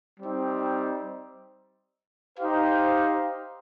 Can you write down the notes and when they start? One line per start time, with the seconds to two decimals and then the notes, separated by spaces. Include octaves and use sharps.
0.20 G3 C4 D#4
2.38 D#4 G4 C5 F5